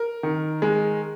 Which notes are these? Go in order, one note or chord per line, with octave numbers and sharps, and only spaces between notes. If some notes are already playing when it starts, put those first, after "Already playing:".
Already playing: A#4
D#3
G#3